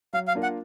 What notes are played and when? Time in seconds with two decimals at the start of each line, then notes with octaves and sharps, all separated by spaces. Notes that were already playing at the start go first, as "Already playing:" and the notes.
0.13 F#3 F5
0.28 F5
0.35 A#3 D4 F4 A#4
0.43 F#5